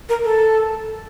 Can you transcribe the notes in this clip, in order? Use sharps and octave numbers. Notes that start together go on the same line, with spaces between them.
A#4
A4